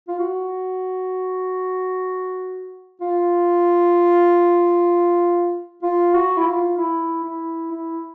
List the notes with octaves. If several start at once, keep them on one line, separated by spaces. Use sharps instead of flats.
F4
F#4
F4
F4
F#4
E4
F4
E4
E4
E4